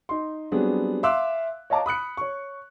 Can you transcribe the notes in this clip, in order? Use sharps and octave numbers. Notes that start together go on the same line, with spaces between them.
D#4 C6
F#3 G3 B3 C4 D4 G#4
E5 F5 C6 D6 E6 F#6
C#5 D#5 F5 A5 A#5 D6
B5 D#6 F#6 C#7
C#5 C#6